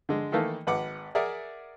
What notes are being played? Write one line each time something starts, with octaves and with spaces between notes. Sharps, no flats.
D3 G#3
D#3 E3 A3 A#3 A4
G#1 B4 F#5 D6
G#4 A#4 D5 E5 F#5